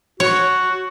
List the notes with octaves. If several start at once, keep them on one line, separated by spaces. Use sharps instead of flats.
F#4 C#5